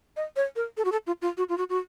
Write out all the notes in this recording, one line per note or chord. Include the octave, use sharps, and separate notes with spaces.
D#5
C#5
A#4
A4
F#4
A4
F4
F4
F#4
F4
F#4
F#4